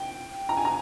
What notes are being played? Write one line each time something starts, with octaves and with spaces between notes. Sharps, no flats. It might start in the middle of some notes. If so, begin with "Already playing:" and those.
Already playing: G5
A#5
G#5
A#5